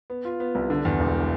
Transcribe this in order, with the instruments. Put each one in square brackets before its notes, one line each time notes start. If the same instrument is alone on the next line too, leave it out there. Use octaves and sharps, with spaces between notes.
[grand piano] B3
F4
B3
C2
D3
E2
E1